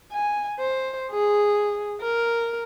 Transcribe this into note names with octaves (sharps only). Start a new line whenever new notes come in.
G#5
C5
G#4
A#4